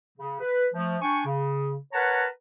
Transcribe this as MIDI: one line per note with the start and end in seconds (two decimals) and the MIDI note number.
0.18 0.36 49
0.40 0.67 71
0.73 0.96 53
0.73 0.96 57
1.01 1.22 62
1.01 1.22 79
1.01 1.22 80
1.01 1.22 85
1.26 1.76 49
1.93 2.25 70
1.93 2.25 71
1.93 2.25 73
1.93 2.25 78
1.93 2.25 81
1.93 2.25 82